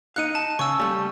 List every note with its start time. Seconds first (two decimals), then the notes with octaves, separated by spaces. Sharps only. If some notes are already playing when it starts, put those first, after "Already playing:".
0.16 D#4 F5 F#6 C#7 D#7
0.35 A5
0.59 C#3 C#6 E6
0.80 G3 A3